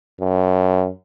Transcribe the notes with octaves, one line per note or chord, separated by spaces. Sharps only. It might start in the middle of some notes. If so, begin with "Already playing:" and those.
F#2